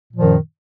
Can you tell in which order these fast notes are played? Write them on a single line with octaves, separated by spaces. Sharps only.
A#2 F3 D#3 F#2